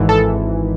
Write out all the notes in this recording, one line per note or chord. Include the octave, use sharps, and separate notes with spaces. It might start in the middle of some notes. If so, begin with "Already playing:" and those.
Already playing: G#1 G#2 E3
A4